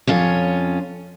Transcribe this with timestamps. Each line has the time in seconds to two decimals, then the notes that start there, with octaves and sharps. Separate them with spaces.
0.07 F2 C#4 F4 C#5